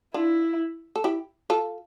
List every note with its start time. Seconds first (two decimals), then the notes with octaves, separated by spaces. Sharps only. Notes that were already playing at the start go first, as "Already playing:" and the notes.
0.14 D4 E4 F4
0.96 A4
1.04 E4 G4
1.50 F4 A4